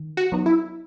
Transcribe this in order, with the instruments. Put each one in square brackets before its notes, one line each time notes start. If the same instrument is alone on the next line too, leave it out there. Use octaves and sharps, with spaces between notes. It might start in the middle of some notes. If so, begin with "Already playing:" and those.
Already playing: [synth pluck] D#3
[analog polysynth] F#4
[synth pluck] F#3 B3 D#4
[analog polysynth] E4